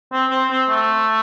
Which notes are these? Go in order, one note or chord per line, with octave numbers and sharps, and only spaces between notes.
C4
C4
C4
A3